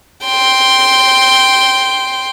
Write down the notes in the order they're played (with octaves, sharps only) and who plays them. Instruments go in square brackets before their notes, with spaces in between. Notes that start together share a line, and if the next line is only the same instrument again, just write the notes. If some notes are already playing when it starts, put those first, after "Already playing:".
[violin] G5 C6